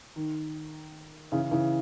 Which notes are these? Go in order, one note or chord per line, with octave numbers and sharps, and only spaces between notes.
D#3
C#3 E3
C#3 E3